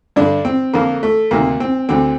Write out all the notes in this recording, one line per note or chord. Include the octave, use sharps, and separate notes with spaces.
G2 D3 D4
C4
F2 D3 A#3
A3
D2 C3 D#3 A#3
C4
D2 D3 C4